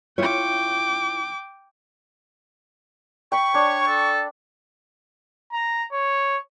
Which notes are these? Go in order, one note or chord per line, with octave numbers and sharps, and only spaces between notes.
E4 F4 C#5 G5 D6
G5 B5 C#6
D4 C#5
A4
A#5
C#5